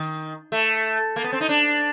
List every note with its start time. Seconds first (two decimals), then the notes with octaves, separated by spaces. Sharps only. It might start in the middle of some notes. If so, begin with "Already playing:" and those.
Already playing: D#3
0.52 A3
1.16 A#3
1.24 B3
1.32 C4
1.41 D#4
1.49 D4